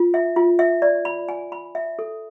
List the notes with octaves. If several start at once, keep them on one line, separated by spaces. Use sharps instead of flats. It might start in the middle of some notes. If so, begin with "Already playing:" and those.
Already playing: F4
E5
F4
E5
D5
B5
G#5
B5
E5
A4